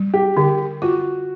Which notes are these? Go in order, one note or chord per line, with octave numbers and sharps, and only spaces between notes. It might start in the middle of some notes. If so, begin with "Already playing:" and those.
Already playing: G3
G4
D3 G4
F4 F#4